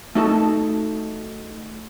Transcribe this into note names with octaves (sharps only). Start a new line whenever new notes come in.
A3 D#4 F#4 A4 A5